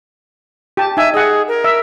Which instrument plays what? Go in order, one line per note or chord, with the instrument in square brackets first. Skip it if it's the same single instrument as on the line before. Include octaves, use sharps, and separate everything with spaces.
[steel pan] G4 A5
[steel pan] D#4 G#5 [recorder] E5
[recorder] G#4 [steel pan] D#5 F#5
[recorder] A#4
[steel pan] E5